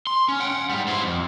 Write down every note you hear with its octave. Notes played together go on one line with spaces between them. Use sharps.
C6
C#4
F#5 G5
G#2 G3
E4 C5
F2